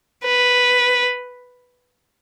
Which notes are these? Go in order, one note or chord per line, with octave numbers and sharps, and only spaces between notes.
B4